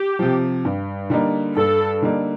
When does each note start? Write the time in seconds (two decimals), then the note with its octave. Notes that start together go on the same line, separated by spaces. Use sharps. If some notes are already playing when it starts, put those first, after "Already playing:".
Already playing: G4
0.19 C3 F3
0.65 G2
1.10 D3 G3 A#3 D#4
1.56 G2 A4
2.02 D3 G3 A#3 D#4